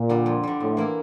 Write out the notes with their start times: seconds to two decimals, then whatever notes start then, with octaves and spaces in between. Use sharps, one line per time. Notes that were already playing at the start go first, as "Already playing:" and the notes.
Already playing: A#2
0.09 D3 G3
0.26 F2
0.43 D3 G3
0.60 F2 A2
0.77 E3 A#3 E4